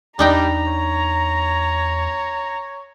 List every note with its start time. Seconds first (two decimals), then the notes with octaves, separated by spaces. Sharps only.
0.19 E2 G3 D4 D#4 G5 A#5
0.68 C#5